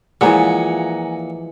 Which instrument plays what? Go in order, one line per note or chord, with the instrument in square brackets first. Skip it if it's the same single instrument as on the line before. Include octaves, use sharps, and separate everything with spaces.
[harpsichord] A#2 [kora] E3 F3 G#3 [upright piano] F#5 G#5 A#5